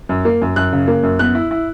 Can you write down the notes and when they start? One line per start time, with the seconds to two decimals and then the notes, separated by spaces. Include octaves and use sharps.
0.09 F#2
0.25 A#3
0.42 F#2
0.56 F#2 F#6
0.73 C#3
0.88 A#3
1.03 F#2
1.19 B3 F#6
1.35 E4
1.51 E4